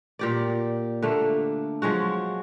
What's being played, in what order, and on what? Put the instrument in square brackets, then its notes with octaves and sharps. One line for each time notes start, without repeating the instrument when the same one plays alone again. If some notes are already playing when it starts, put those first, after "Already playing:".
[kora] A#2 G4 D5
D3 A3 A#3
F3 F#3 G#3 F#4